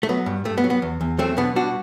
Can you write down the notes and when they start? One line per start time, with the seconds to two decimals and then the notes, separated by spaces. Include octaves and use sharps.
0.03 A3
0.09 F#3 B3
0.26 G2
0.45 G2 A3
0.58 B3
0.64 F#3
0.70 B3
0.82 E2
1.01 E2
1.18 F#3 A3 C4
1.37 B2 B3 D4
1.55 G3 D4 F#4